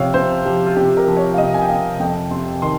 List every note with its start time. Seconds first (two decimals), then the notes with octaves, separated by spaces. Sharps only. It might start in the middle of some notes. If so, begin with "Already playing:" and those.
Already playing: C3 F3 C#5 F5 G5
0.14 C3 C5
0.45 F3 G4
0.67 F4
0.76 C3 G4
0.97 A#4
1.08 F3
1.17 C#5
1.34 F5
1.38 C3 D#5
1.54 G#5
1.62 G5
1.69 C3 F5
2.00 F2 G5
2.31 C3 C6
2.62 D#3 C6